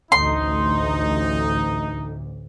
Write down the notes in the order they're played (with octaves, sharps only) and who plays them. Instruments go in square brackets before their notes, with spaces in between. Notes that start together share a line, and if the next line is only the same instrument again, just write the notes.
[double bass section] A1 D2 [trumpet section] D#4 [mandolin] C6